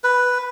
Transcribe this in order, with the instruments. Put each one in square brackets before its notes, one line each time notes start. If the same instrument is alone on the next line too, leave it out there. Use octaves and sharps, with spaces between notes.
[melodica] B4